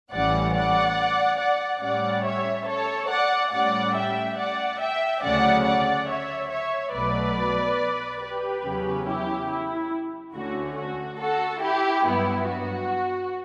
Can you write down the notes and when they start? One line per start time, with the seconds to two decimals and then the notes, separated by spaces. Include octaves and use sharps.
0.11 A1 A2 E3 G3 C#4 D5 F#5
0.53 D5 F#5
1.39 D5 F#5
1.81 A2 G3 C#4 D5 F#5
2.24 C#5 E5
2.67 A4 C#5
3.09 D5 F#5
3.52 A2 G3 C#4 D5 F#5
3.95 E5 G5
4.37 D5 F#5
4.80 E5 G5
5.22 D2 C#3 F#3 A3 C#4 D5 F#5
5.65 D5 F#5
6.07 C#5 E5
6.50 C#5 E5
6.93 B1 B2 F#3 A3 B4 D5
8.21 G4 B4
8.63 E2 C#3 F#3 C#4
9.06 E4 G4
9.49 E4
10.34 D2 D3 A3 C#4 F#4
10.76 F#4
11.19 F#4 A4
11.61 E4 G4
12.04 G2 F#3 B3 E4
12.47 F#4